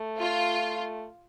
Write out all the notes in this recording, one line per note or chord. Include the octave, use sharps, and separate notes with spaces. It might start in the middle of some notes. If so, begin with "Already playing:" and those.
Already playing: A3
F4